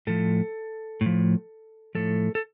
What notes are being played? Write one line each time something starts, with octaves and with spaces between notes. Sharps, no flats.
A2 F3 A4
A2
F3
A2 F3 A4
A4